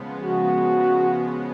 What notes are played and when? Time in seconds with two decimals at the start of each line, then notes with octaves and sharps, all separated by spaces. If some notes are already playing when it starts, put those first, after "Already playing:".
Already playing: C#3 F3 G#3 B3
0.23 F#4